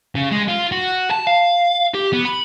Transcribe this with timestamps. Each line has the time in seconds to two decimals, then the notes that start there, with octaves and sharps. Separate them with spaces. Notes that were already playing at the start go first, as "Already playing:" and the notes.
0.15 C#3
0.32 G#3
0.48 F4
0.72 F#4
1.11 A5
1.27 F5
1.94 G4
2.13 B3
2.25 B5